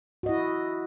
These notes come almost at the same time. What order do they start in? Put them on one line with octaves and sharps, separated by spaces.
F#4 D#5 E4